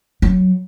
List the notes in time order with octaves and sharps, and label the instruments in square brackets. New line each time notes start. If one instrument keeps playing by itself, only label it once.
[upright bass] F#3